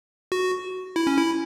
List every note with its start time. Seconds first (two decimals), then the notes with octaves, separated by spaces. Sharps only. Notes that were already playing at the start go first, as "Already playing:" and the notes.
0.32 F#4
0.96 E4
1.07 C#4
1.18 E4